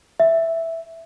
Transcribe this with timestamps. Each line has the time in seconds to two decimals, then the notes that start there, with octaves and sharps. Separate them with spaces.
0.20 E5